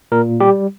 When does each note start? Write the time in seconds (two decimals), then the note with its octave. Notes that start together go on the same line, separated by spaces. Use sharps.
0.12 A#2 A#4
0.40 G3 G4